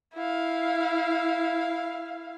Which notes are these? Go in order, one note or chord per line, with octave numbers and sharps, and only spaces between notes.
E4 F5